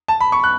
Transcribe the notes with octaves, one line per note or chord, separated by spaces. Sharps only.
A5
B5
C#6
F#6